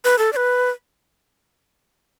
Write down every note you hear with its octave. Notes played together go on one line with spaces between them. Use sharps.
B4
A4
D5
B4